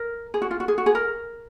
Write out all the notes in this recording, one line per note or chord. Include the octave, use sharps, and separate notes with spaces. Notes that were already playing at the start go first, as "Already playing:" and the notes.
Already playing: A#4
G#4
F#4
F4
F#4
G#4
F#4
G#4
A#4